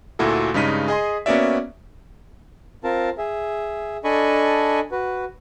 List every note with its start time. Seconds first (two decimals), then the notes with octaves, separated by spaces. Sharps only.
0.19 D2 A#2 E4 F#4 A4
0.54 G2 C#3 G#3 D#4 B6 D#7
0.88 G#4 D#5 G#5 C6
1.26 A#3 B3 C#4 F#4 D5 E5
2.84 C4 F4 A#4 A5
3.18 G#4 E5
4.04 D4 A4 D#5 G#5 B5 C#6
4.91 F#4 B4